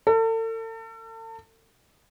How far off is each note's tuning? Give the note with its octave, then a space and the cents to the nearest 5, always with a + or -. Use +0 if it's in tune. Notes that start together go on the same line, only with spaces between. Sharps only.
A4 +40